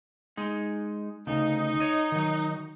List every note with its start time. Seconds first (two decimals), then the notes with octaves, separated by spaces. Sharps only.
0.37 G#3 D#4
1.27 D2 C#3 D#4
1.80 C#5 D#5
2.12 D#3 F#3